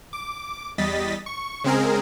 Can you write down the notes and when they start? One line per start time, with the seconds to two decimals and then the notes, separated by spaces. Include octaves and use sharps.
0.13 D6
0.78 E2 G3 D#5 A6 B6
1.26 C#6
1.64 C#3 G#3 C4 G#4 A#4